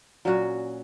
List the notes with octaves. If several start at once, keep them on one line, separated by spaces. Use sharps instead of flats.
A#2 F#3 C#4 F#4